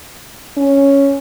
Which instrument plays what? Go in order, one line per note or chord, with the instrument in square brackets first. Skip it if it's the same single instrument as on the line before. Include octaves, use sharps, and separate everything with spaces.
[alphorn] C#4